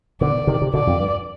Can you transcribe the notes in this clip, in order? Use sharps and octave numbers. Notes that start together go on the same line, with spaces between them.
B2 D3 D5
C3 D#3
C3
B2 D3 D5
F2
G2